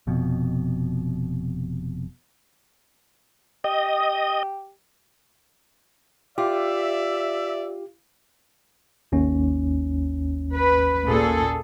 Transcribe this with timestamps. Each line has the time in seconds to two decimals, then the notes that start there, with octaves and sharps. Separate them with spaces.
0.07 F1 F2 B2
3.64 G4 D#5
6.38 F4 G4 D5 E5
9.12 G#1 D#2 C#4
10.55 B4
11.06 A#2 G#4 A4